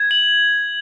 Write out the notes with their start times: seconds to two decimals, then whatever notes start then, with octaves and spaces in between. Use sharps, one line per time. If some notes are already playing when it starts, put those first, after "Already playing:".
Already playing: G#6
0.11 F#7